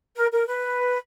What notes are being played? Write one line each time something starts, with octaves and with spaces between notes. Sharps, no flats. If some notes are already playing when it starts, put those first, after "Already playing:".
A#4
A#4
B4